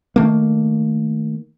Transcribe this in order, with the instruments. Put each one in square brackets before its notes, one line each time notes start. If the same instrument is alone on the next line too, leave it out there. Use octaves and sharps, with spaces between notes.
[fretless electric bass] D#3 A3 A#3